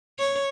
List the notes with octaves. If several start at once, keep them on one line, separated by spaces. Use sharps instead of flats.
C#5